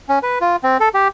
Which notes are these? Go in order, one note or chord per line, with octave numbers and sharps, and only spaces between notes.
C#4
B4
F4
C4
A4
G4